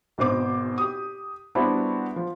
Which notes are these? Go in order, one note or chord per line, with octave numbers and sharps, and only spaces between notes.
G#1 B2 C5 D6
G4 D#6
G3 B3 C4 D4 E4 F#4
F3